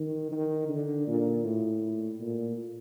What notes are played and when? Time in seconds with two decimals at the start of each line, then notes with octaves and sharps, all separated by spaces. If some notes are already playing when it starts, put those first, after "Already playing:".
Already playing: D#3
0.31 D#3
0.69 D3
1.07 A#2
1.45 A2
2.20 A#2